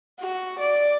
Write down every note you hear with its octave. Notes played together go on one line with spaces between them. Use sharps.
F#4
D5